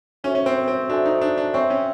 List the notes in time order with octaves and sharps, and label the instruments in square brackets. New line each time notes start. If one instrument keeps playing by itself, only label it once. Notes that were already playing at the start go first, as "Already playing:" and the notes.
[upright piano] C#4 [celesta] F#4 A4 C5 E5 G#5
[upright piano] C#4
C4
C4
[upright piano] D4 [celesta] F#4 A4 C5 E5 G#5
[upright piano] D#4
D4
D4
[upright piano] C4 [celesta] C#5 E5 G#5 C#6
[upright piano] C#4